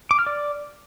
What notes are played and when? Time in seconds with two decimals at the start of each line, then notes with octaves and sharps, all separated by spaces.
0.11 D6
0.19 F6
0.27 D5